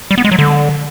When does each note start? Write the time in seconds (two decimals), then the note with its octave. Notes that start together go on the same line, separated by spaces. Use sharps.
0.11 G3
0.18 B3
0.25 G#3
0.32 F#3
0.39 D3